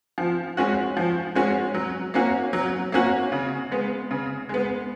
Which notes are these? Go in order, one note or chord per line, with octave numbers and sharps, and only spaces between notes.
F3
G#3 C#4 F#4
F3
G#3 C#4 F#4
F#3
A#3 C#4 F#4
F#3
A#3 C#4 F#4
C#3
G#3 B3
C#3
G#3 B3